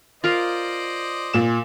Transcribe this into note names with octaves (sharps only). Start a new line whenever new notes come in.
F4 A#4 C5 D5 D#5 F5
A#2 E7